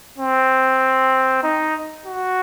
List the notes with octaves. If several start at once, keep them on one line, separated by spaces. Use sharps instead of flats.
C4
D#4
F#4